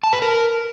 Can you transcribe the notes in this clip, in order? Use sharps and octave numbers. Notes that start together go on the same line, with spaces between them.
A5
B4
A#4